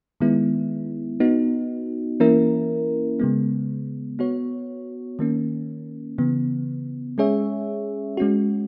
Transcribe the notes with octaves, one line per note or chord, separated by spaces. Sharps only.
D#3 G#3 B3 E4
B3 D#4 F#4
E3 A#3 C#4 E4 A#4
C#3 G#3 B3
B3 F#4 C#5
D#3 A#3 C#4
C#3 E3 B3
G#3 C#4 G#4 C#5 E5
G#3 C#4 F#4